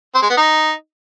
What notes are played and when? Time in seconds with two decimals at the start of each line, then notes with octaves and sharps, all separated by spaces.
0.15 C4
0.22 G#3
0.30 B3
0.37 D#4